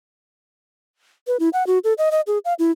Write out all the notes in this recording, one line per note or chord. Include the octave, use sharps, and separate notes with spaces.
B4
E4
F#5
F#4
A4
D#5
D#5
G#4
F5
E4